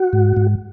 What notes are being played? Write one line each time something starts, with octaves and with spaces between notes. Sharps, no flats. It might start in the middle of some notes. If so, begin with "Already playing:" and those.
Already playing: F#4
G#2
G#2